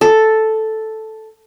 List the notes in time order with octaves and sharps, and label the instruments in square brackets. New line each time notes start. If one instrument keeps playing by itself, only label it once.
[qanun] A4